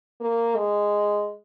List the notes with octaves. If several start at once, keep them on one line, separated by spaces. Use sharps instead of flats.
A#3
G#3